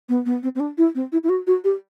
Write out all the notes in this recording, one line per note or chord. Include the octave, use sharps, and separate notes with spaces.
B3
B3
C4
C4
D4
E4
C4
E4
E4
F#4
F#4
G4